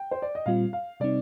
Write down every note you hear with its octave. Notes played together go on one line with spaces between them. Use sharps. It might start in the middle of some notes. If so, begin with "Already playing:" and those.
Already playing: G5
C5
D5
D#5
A#2 G3 C4 F4 F5
F5
C3 G3 C4 D#4 D5